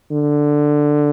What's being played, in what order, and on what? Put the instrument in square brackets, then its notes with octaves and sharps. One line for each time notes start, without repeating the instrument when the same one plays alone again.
[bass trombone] D3